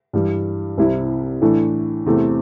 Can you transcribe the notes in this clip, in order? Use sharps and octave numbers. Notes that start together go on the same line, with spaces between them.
G2 E3 G3
C2 C3 G3 E4
A2 E3 A3 D4
E2 C3 A3 C4 E4